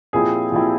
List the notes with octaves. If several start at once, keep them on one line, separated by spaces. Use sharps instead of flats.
A#2 F3 C4 E4 G4 G#4
A#2 F3 C4 E4 G4